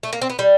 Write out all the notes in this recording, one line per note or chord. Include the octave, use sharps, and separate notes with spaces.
A3
A#3
C4
B3
G3